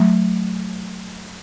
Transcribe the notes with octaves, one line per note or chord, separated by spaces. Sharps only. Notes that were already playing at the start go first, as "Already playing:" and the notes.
Already playing: F#3 A3